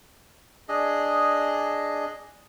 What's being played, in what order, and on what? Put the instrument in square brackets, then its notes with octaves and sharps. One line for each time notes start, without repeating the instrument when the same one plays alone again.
[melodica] D4 G#4 D#5